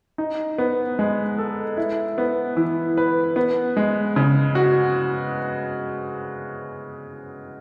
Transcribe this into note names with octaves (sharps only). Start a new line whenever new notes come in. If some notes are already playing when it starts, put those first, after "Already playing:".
D#4
B3
G#3
A4
E4
B3
E3
B4
B3
G#3
C#3
F#4